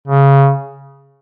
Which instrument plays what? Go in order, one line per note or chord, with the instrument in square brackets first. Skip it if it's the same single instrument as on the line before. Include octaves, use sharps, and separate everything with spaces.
[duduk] C#3